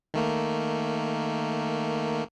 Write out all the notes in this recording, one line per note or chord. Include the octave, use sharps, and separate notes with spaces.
D#3 A3 A#3